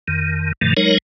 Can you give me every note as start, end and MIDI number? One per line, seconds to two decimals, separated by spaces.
0.08 0.52 41
0.08 0.52 51
0.61 0.74 43
0.61 0.74 47
0.61 0.74 51
0.61 0.74 53
0.61 0.74 57
0.77 0.98 54
0.77 0.98 56
0.77 0.98 63
0.77 0.98 70
0.77 0.98 73